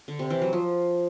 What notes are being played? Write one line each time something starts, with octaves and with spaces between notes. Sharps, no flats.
D3
C3
E3
F#3
F3